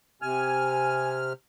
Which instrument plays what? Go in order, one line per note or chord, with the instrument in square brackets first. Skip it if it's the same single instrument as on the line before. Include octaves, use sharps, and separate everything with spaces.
[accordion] C3 F6 [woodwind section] G#5